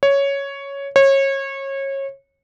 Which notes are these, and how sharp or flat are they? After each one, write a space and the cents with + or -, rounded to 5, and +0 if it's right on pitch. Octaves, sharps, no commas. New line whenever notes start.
C#5 +5
C#5 -25